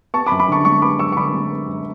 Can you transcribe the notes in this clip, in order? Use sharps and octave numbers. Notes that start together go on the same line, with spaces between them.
B3 A5 C#6
B5 D6
F#2
B5 D6
D3 A5 C#6
G#3 A5 C#6
B3 B5 D6
F#2 C#6 E6
C#6
D3 B5 D6
G#3
B3
F#2